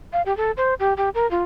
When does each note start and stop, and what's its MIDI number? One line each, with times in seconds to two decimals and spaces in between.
0.13 0.22 77
0.26 0.35 67
0.37 0.51 69
0.57 0.74 72
0.80 0.93 67
0.97 1.10 67
1.15 1.29 70
1.31 1.43 65